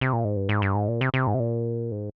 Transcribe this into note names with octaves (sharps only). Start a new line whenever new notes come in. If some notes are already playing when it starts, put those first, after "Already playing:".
C3
A#2
G#2
G2
G#2
G2
G#2
A#2
C3
C3
G#2
C3
A#2
G#2